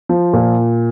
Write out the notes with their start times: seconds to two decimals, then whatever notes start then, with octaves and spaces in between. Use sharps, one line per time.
0.09 F3
0.33 A#2